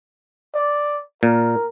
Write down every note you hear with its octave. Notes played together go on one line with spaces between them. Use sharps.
D5
A#2 A#4